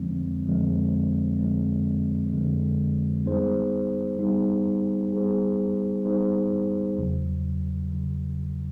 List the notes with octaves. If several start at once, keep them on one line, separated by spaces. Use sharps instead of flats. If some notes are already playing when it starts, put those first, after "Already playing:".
Already playing: F2 D3 F3 G#3 C4
F2 D3 F3 G#3 C4
F2 D3 F3 G#3 C4
F2 D3 F3 G#3 C4
G3 B3 D#4 G#4 C5
G3 B3 D#4 G#4 C5
G3 B3 D#4 G#4 C5
G3 B3 D#4 G#4 C5
E2 C#3 F#3
E2 C#3 F#3